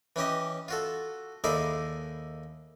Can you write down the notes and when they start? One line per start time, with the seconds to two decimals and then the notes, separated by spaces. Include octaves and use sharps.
0.16 E3 C#4 G4 D#5
0.68 F4 F#4 A4
1.44 D#2 D#4 E4 G#4 A4 D5